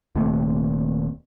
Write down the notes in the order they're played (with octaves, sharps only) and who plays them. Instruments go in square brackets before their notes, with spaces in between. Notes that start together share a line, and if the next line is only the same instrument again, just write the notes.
[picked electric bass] D#1 D#2 C3 A3